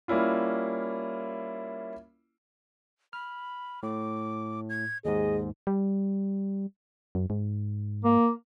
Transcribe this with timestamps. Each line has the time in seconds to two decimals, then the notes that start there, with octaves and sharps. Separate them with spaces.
0.08 G3 A#3 C#4 E4 F4
3.13 B5 F6
3.83 A2 D6
4.70 G#6
5.05 D#2 G#2 G#4 D#5
5.67 G3
7.15 F#2
7.30 G#2
8.04 A#3